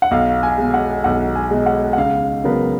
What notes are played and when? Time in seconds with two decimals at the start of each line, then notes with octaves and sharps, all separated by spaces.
0.02 F#5
0.11 B1 F5
0.43 G#5
0.58 B2 G#3
0.74 F#5
1.04 B1 F#5
1.35 G#5
1.51 B2 G#3
1.66 F#5
1.93 F#5
1.97 C#2 F5
2.44 C#3 F#3 B3 A#4